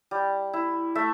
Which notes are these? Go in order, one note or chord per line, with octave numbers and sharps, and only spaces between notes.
G3
E4
A3 E5